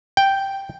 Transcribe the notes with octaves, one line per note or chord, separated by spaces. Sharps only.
G5